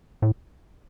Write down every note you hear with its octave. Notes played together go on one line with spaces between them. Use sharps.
A2